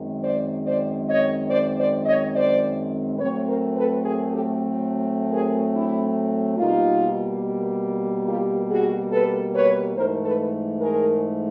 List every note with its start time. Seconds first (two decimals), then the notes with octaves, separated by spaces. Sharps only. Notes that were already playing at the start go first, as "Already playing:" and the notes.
Already playing: F#2 D#3 G#3 C4
0.22 C5 D5
0.64 C5 D5
1.07 C#5 D#5
1.49 C5 D5
1.77 C5 D5
2.05 C#5 D#5
2.33 C5 D5
3.18 A2 F#3 A3 C4 B4 C#5
3.47 A#4 C5
3.75 A4 B4
4.03 G#4 A#4
4.31 G4 A4
5.30 G#4 A#4
5.72 D4 E4
6.57 B2 G3 A#3 D#4 F4
8.26 F4 G4
8.69 F#4 G#4
9.11 A4 B4
9.53 B4 C#5
9.96 G#2 E3 A3 A#4 C5
10.24 A4 B4
10.80 G#4 A#4